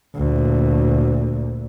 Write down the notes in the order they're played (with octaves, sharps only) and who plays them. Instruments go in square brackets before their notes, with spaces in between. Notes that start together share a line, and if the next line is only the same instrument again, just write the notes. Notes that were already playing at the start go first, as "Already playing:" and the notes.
[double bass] D2 A#2